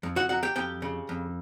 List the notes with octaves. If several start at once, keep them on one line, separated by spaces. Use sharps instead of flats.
F2
F#4 F#5
F#3 F#4 F#5
G4 G5
F2 G4 G5
C#3
F2